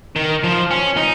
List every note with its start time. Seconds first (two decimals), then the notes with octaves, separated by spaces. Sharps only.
0.16 D#3
0.44 F3
0.71 C#4
0.97 D#4